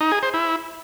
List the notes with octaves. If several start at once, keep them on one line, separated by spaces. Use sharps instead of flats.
D#4
G#4
C5
E4